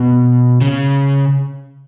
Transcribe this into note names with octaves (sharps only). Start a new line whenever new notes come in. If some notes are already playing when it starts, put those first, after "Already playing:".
Already playing: B2
C#3